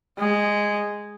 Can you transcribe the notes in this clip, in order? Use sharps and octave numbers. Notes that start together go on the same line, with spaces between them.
G#3